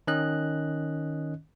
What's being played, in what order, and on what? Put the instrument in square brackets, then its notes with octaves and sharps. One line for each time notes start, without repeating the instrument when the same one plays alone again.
[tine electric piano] D#3 C#4 D#5 F#6